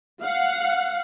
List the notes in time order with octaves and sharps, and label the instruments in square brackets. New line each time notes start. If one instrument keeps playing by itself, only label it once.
[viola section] F5 F#5